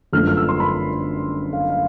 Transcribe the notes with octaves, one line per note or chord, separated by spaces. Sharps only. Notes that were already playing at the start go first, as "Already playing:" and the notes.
G1 F#2 D3 F3 A3 F6
F6
E6
C6
B5
F5
F5